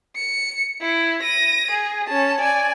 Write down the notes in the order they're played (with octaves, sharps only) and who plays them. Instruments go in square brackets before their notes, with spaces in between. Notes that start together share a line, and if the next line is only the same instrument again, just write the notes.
[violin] C#7
E4
A#6 D#7
G#4
C#4 A5
D5 G#5